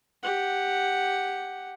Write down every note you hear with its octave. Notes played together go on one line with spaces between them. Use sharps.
G4 F#5